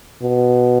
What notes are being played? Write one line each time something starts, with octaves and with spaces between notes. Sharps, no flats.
B2